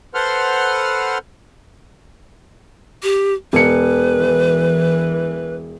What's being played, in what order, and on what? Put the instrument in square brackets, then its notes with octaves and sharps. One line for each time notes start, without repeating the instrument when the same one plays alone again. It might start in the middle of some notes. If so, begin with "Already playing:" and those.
[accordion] A4 B4 C5 F#5 C6 F6
[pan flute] G4
[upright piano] E1 C#7 [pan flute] B4
[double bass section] E3